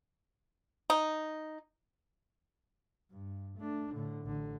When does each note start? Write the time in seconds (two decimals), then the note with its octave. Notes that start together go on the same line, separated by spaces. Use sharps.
0.90 D#4
3.10 G2
3.58 A3 D4
3.93 A2 D3
4.25 A1 D3